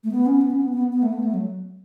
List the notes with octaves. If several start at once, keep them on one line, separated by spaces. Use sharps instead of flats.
A3
B3
C#4
B3
C#4
B3
B3
B3
A3
B3
A3
F#3